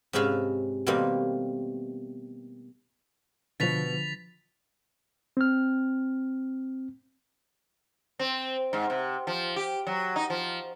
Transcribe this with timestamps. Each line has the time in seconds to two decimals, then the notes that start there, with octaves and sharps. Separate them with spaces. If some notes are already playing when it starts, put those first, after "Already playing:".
0.13 G#2 C3 C#4 B4 E5 F5
0.87 B2 D#3 G3 A3 A#3 C4
3.60 B2 D3 F3 A6 B6 F7
5.37 C4 F6
8.19 C4
8.73 G#2
8.90 C3
9.27 F3
9.56 G4
9.87 F#3
10.16 D#4
10.30 F3